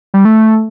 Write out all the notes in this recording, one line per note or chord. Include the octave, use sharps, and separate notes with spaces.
G3
A3